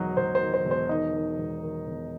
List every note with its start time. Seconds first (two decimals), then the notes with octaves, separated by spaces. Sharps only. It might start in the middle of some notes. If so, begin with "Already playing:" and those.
Already playing: E1 D#3 F#3 D#4
0.17 E1 C5
0.35 C5
0.41 D#3
0.54 C5
0.65 E1
0.71 C5
0.89 D#3 D#4 D#5
1.14 D#3
1.38 E1
1.62 D#3
1.87 E1